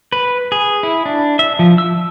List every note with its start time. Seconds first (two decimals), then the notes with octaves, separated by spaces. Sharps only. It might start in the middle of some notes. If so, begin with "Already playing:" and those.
0.12 B4
0.52 G#4
0.83 E4
1.06 D4
1.39 E5
1.59 F3
1.78 E6